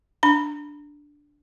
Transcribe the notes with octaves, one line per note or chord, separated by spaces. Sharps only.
D4 B5